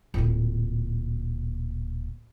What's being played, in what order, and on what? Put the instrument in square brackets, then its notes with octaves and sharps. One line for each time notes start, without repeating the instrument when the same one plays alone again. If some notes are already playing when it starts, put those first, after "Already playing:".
[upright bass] D1 A#2